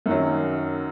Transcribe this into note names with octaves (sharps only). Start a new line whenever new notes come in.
F#2 D#3 F#3